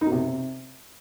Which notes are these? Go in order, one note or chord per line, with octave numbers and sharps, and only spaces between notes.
D#4
B2
C3